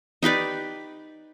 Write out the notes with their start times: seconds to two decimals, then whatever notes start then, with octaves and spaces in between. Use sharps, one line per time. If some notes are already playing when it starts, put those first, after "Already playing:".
0.23 D#4 G4 B4 D5